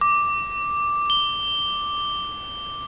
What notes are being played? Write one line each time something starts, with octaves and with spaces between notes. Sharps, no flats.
D6
G7